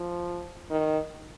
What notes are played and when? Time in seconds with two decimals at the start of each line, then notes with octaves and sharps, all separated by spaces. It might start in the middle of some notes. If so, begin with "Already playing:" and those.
Already playing: F3
0.71 D#3